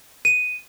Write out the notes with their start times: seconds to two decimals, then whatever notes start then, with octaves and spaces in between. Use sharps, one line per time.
0.25 D#7